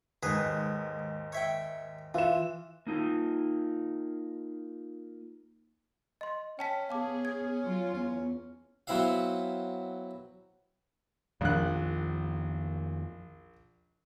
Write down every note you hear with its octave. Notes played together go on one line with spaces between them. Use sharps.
D#2 G#2 G#4 B4
C#5 E5 G5
E3 F4 E7
A#3 D#4 F4
D#5 C6
C#4 G5 A5 B6
B3 G#4 F5 A5 D6
G#6
F#3 F4
E2 C#4
F#3 B3 C4 E4 E5 F5
A#1 F2 D#3 F3 F#6